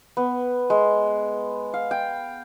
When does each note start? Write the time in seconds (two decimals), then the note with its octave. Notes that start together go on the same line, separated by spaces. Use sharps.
0.17 B3
0.70 G#3
1.74 F5
1.91 G5